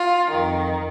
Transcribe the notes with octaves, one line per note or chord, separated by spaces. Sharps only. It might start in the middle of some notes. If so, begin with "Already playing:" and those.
Already playing: F4
F2 D#3